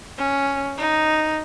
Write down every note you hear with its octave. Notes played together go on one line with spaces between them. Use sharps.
C#4
D#4